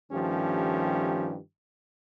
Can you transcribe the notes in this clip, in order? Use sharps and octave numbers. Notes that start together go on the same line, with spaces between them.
G2 D#3 F3 A3 C#4 G4